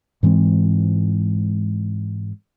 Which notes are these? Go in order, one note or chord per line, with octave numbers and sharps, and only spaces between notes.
G#2 E3 G#3 C4